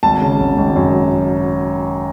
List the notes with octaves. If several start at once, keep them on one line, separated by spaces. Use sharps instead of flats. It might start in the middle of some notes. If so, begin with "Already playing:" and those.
G#1 A5
C#3
G#1
G#1
F#2